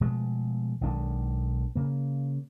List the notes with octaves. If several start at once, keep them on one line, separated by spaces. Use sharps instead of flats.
B2 F3 G#3 A3
B1 D#3 G#3 D4
C#3 A#3